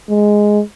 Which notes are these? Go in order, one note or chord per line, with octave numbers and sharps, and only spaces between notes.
G#3